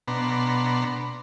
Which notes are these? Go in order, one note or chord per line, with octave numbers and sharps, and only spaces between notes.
B2 B3 D4 A#5 C6